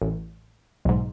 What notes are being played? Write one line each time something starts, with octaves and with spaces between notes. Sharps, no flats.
A1
B1 G#2